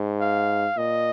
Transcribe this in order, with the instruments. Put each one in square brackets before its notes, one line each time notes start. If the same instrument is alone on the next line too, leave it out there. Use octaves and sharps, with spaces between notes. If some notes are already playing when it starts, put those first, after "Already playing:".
Already playing: [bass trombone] G#2
[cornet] F5
[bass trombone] A#2 [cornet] D#5